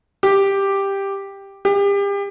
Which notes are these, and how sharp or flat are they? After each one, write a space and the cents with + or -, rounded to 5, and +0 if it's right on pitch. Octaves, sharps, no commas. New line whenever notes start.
G4 +5
G4 +35